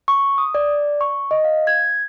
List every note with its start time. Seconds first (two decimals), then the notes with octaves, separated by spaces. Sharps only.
0.08 C#6
0.38 D#6
0.54 D5
1.01 C#6
1.31 D#5
1.44 F5
1.67 G#6